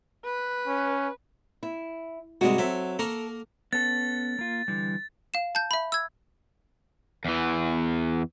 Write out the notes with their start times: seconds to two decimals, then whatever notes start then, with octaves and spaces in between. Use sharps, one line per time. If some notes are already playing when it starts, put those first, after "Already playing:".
0.25 B4
0.67 C#4
1.63 E4
2.41 G#2 C3 G3 G#3 F#4
2.58 F#3 C4 A4 E5
2.99 A#3 A4 A#4 C#6
3.73 B3 C#4 A4 A6
4.39 A#3 F4
4.68 D3 E3 G3
5.34 F5 E7
5.55 A5 G6
5.71 E5 B5
5.92 E6 G#6
7.25 E2 E3